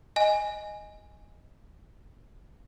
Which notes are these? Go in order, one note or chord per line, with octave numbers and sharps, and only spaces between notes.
D#5 G#5